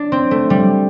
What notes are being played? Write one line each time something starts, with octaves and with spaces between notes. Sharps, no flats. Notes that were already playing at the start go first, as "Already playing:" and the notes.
Already playing: D4
C4
A3
G3